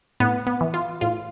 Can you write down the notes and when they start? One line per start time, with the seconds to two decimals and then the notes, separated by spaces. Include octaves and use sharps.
0.20 A2 B3
0.47 B3
0.61 E3
0.74 F4
1.01 A2 F4